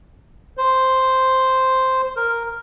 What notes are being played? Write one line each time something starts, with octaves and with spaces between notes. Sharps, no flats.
C5
A#4